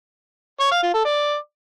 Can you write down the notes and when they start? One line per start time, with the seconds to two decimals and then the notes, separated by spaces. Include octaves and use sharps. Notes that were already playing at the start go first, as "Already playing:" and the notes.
0.60 C#5
0.72 F5
0.83 F4
0.94 A4
1.05 D5